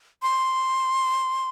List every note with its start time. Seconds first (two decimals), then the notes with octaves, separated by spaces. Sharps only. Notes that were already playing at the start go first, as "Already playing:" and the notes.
0.22 C6